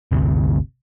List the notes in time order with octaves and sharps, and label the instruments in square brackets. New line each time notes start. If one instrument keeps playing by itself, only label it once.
[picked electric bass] G1 D2 C3